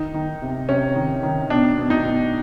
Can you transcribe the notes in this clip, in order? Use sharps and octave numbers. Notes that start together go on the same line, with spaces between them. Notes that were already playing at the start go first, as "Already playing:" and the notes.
Already playing: D#3 D#4
D#3
C3
C3 C#4
D#3
D#3
B2 D4
B2
D#4
B2